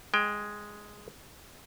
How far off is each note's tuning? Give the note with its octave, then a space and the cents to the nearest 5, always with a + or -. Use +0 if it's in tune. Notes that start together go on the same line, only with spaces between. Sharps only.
G#3 +0 G5 +15